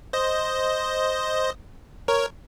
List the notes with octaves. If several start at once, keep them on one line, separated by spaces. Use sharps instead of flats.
C5 D#5
A#4 C#5